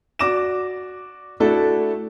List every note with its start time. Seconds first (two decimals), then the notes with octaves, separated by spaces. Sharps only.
0.19 F#4 D5 D6 A#6 E7
1.40 A3 D4 E4 F#4 A4